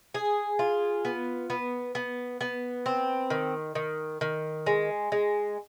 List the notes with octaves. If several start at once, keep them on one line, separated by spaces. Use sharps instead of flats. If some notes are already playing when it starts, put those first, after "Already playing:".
G#4
F4
B3
B3
B3
B3
C4
D#3
D#3
D#3
G#3
G#3